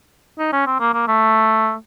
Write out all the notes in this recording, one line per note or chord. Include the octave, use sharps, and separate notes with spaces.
D#4
C#4
C4
A#3
A#3
A3